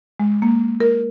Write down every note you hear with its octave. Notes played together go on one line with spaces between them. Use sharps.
G#3
A#3
A#4